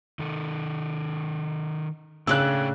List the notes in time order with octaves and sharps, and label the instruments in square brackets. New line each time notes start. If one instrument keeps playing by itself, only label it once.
[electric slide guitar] D#3 A4
[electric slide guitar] A2 A3 G5 [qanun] C#3 D4 [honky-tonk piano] E6 F#6